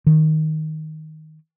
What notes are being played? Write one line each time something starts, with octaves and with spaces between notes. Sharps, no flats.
D#3